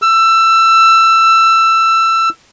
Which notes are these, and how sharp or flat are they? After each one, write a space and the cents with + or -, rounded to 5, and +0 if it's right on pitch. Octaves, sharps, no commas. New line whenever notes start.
E6 +20